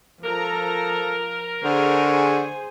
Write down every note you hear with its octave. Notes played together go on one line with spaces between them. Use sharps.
F3 A4 A#4 A#5
D3 G#4 C5 G#5 C#6